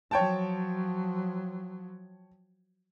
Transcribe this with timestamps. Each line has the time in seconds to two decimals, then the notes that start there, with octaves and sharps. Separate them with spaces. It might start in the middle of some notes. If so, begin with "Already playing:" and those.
0.11 F3 F#3 C#5 G5 A5